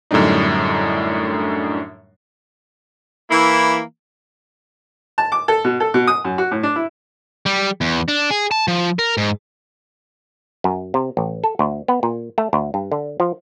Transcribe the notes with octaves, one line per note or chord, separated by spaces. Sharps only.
F#2 A2 D3 G3 D4 D#4
E3 A#3 E4
A5
D6
A4
B2
A4
B2
D#6
F#2
F#4
A2
D4
E4
G3
E2
D4
G#4
A5
F3
A#4
G#2
F#2
C3
A1
A4
D2
B3
A#2
A3
D2
G2
D3
F3